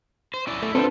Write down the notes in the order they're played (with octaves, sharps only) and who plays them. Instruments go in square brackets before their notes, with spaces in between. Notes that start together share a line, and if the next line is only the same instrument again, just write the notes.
[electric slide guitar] C5
C#4 E4 D5
[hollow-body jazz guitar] A3
[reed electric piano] C4 B4 C5 [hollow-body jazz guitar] D4 A4 [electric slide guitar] F4 E5